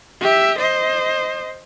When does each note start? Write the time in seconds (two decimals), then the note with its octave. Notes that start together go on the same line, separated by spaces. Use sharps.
0.21 G4 E5
0.58 C5 D#5